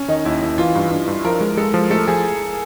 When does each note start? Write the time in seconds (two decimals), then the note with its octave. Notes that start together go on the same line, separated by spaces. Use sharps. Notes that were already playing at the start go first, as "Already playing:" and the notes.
Already playing: C#4
0.08 D#3 D#4
0.25 D#2 E4
0.42 D#2 E4
0.58 E3 F4
0.75 G2
0.91 G2
1.07 G2
1.24 F3 A#4
1.41 G#3
1.57 G#3 A4
1.74 F3
1.91 A3 A4
2.07 F3 G#4